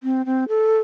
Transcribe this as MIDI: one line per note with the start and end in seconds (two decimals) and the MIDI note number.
0.03 0.25 60
0.26 0.44 60
0.48 0.80 69